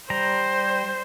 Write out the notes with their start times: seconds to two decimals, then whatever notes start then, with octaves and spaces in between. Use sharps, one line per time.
0.10 G3 C5 A#5